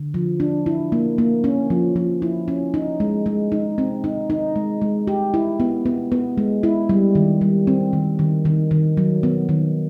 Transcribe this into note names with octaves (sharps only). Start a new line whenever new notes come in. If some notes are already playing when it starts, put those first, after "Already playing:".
Already playing: D3
F3
D4
E4
A#3
A#3
C#4
F3
F3
E4
C#4
D#4
G#3
G#3
D#4
C4
D#4
D#4
G#3
G#3
G4
E4
B3
B3
B3
G#3
E4
G3
D#3
G3
C4
D#3
D#3
D#3
D#3
F#3
B3
D#3